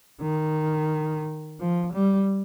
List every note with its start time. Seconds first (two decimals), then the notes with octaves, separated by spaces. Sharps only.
0.21 D#3
1.59 F3
1.93 G3